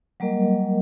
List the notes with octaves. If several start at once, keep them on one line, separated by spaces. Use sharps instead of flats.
F#3 G3 A#3 A#4 D#5